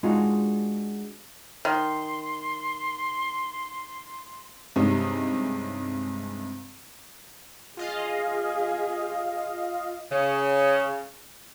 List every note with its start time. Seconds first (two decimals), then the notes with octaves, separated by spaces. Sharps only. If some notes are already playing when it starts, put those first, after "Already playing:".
0.03 G#3 D4 D#4 F4 F#4
1.65 D#3 C6
4.76 G2 C3 G#3 C#4 D#4
7.77 F4 G#4 D#5 F5
10.12 C#3